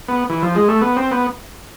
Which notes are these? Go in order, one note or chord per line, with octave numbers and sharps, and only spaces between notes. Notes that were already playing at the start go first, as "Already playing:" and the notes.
B3
E3
F3
G#3
A3
B3
C4
B3